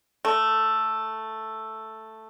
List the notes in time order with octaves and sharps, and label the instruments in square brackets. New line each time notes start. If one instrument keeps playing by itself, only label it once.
[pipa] A3